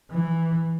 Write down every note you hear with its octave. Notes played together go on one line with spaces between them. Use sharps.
E3